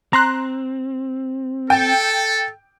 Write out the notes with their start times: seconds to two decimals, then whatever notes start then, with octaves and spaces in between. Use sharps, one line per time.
0.13 C4 A#5 C6 F#6
1.70 A4 G5